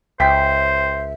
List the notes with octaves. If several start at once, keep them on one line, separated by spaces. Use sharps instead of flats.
C#2 C5 E5 G5 B6